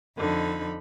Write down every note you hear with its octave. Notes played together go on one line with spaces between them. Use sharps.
F2 D3 D#4 B5